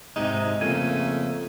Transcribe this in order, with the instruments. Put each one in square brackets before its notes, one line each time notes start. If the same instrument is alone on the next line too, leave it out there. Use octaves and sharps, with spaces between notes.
[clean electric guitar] G#2 C3 G#3 [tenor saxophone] D#4
[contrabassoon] F2 [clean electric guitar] C#3 A#3 G#5 [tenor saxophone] A3